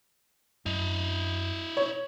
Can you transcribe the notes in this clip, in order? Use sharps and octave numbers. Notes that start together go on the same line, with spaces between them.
F#2 E4 D#5
C#5